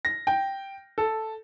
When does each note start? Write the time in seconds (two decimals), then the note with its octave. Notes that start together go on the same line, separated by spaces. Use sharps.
0.05 A#6
0.27 G5
0.98 A4